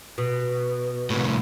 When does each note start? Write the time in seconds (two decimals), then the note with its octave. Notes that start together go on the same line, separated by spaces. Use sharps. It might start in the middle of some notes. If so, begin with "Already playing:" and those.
0.18 B2
1.10 C2 A2